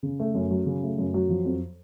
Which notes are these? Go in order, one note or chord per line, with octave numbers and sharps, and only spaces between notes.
C#3
A3
F#2
F#3
C#3
A3
F#2
F#3
F3
F2